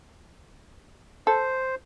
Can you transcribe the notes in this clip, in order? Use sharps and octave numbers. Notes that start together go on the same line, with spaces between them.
A4 C5